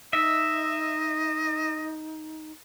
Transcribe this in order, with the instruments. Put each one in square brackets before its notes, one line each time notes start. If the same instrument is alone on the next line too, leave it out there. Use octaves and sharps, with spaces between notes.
[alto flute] D#4 [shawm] D#5 [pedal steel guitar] E5